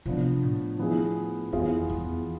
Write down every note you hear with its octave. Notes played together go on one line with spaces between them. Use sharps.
C3 F3 B3 D4
A2
F3 B3 E4 G#4
F2 E3 B3 F4 G#4
E2